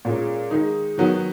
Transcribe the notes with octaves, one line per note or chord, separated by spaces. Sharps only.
A#2 G#3 C#4
D#3 G#3 D#4
D#3 F#3 B3